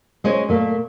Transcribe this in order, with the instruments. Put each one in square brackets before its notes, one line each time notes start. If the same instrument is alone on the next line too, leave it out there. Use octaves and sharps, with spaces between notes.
[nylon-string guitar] G#3 C#4 C5 C#5
A#2 A3 A#3